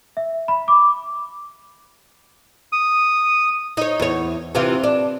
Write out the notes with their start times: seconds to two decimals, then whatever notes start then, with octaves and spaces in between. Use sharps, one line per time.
0.17 E5
0.48 B5
0.68 D6
2.72 D#6
3.77 D#4 C#5
4.00 E2 C#5
4.55 C3 E3 F4
4.83 D4